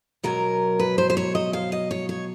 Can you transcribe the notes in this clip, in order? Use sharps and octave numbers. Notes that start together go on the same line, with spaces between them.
B2 F#3 A#4
B4
C5
C5
C#5
D#5
F5
D#5
C#5
C#5